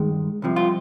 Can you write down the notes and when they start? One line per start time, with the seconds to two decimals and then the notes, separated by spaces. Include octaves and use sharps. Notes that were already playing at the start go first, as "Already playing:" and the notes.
Already playing: G2 D#3 G#3
0.42 C2 C3 F3
0.56 F4